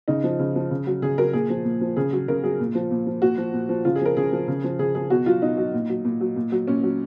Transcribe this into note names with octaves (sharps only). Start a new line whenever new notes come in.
C#3 D#4
F3
C#3
F3
C#3
F#3
C#3 G#4
F#3 A#4
A#2 G#4
F3
A#2
F3
C#3 G#4
F#3
C#3 A#4
F#3 G#4
A#2
F3
A#2
F3
A#2 F#4
F3
A#2
F3
C#3 F4
G#4
F3 A#4
C#3 G#4
F3
C#3
F3
C#3 G#4
F3 G#4
B2 F#4
F#3 F4
B2 D#4
F#3
A#2
F#3
A#2
F#3
A#2
F#3
A#2 C#4
F#3